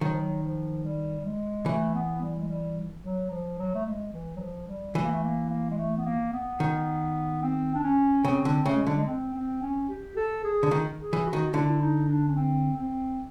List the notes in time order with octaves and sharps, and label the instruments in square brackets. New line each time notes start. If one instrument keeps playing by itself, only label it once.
[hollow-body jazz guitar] D#3 [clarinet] F#3
[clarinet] F3
F#3
F3
G3
G#3
[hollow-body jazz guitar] E3 [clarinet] A3
[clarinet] B3
G3
G#3
G3
F#3
F3
F#3
A3
G#3
E3
F#3
F3
G3
[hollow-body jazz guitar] E3 [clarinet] A3
[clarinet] A#3
A3
A#3
A#3
G#3
A3
B3
A#3
B3
[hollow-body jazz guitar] D#3
[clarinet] C4
D4
C#4
[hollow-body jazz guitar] C#3 [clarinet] C4
[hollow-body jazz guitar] D3
[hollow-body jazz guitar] C#3 [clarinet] A3
[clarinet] G#3
[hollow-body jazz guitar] D3 [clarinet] G3
[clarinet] G#3
C4
C4
C#4
G4
A4
G#4
[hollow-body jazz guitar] D3
D#3
[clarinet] G#4
[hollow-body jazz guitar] E3
[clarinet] F#4
[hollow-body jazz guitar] D#3
[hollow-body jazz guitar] D3 [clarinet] E4
[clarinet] E4
D#4
D4
C#4
C4
C4